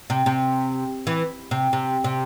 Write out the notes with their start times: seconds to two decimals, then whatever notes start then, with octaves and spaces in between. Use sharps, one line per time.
0.10 C3
0.26 C3
1.07 E3
1.51 C3
1.73 C3
2.04 C3